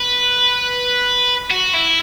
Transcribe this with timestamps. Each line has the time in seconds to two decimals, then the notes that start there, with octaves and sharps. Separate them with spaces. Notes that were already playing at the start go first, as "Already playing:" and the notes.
Already playing: B4
1.51 F#4
1.74 E4